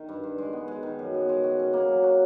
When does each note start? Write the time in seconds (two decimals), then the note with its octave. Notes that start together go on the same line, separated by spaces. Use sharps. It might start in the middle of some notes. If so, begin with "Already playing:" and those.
Already playing: D#3
0.09 G2
0.23 G2
0.38 G#3
0.53 B3
0.68 G#3
0.83 D#3
0.99 F#2
1.14 B3
1.29 G#3
1.44 F#4
1.59 C#4
1.73 A#3
1.89 F#3
2.04 F#4